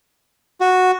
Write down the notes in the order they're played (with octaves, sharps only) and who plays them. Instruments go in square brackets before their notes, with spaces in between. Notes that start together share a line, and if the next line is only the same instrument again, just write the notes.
[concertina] F#4